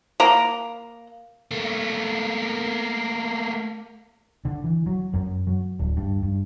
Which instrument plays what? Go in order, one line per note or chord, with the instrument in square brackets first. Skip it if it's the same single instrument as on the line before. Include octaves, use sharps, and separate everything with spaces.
[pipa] A#3 A#5
[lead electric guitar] A3 A#3
[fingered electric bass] D3
E3
F#3
F#2
F#3
D1
G2
G2